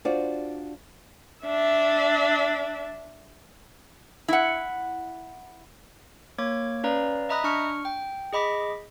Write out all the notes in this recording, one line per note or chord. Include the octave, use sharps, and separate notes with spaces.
D4 F4 F#4 C5 D5
D4 E5
E4 F#5
A#3 C#5 D6 G#6
C#4 B4 D5 F5 A#5
D#5 E5 A#5 B5 D#6 F#6
D4 C#6 F6 C#7
G5
G#4 D#5 B5 D6 B6